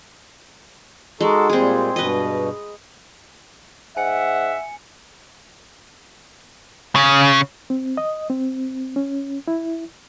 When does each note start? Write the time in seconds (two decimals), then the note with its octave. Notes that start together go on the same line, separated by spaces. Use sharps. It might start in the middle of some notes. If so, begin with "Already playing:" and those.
1.21 G#3 D#4 F#4 A4
1.50 A#2 G3 C4 G#4
1.96 G2 B2 B4 D#5
3.97 G#2 E5 F#5 G#5 C#7
6.95 C#3
7.70 C4
7.97 D#5
8.30 C4
8.96 C#4
9.48 E4